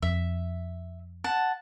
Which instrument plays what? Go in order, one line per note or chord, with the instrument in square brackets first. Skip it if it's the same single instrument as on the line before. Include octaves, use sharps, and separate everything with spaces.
[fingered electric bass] F2 [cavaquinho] E5
[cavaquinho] F#5 A5